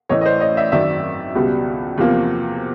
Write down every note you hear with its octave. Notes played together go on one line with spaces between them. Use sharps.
A1 A2 E3 A3 C#5 D#5
D#5
C5 D5
C#5 D#5
D5 E5
G#1 F#2 D#3 D5 E5
C#2 B2 G3
E2 C3 F3 A#3